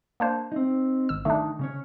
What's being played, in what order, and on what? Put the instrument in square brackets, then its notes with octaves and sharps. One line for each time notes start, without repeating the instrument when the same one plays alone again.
[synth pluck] A#3 D4 C5
[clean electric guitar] C4 D#4
[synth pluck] G#1 E6
[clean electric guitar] D#3 D#4 [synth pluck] A3 D4
[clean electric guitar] C#3 C#4 C#5